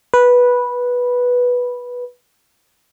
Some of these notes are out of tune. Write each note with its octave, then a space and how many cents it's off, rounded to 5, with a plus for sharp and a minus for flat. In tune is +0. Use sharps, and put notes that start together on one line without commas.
B4 -10